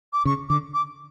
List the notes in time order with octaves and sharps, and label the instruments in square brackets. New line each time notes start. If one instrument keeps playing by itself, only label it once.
[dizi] D6
[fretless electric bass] C#3 [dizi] C#6
[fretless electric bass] D3 [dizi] D6
[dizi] D6